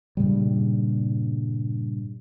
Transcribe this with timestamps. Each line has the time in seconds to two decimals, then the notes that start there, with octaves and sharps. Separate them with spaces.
0.17 G2 A#2 C#3 G3